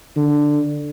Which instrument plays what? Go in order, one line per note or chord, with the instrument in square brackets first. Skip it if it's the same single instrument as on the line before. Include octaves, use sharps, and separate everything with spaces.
[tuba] D3